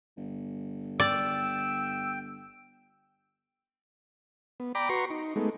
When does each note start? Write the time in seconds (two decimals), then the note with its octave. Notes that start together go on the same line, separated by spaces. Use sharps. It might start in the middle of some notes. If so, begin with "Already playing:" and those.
0.17 G1
1.00 D5 G5 E6
4.60 B3
4.75 D5 G5 A#5 B5 D6
4.89 F#4 B4 A#5 C6 C#6
5.10 D#4
5.36 G#3 A3 B3 D#4